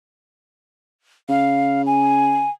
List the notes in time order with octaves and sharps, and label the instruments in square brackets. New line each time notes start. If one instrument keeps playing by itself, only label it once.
[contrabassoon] C#3 [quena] F5
[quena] G#5